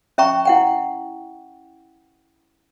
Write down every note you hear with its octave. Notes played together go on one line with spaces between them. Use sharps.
C#4 E5 G5 A#5 C#6
E4 F#5 G5